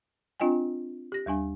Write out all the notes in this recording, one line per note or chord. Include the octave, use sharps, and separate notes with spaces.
C4 D4 F4 D#5 G5 G#5
G4 A#6
D#2 G3 D4 G#5